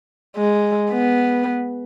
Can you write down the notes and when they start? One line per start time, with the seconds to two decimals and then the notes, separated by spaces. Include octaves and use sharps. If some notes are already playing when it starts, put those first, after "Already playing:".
0.37 G#3
0.91 B3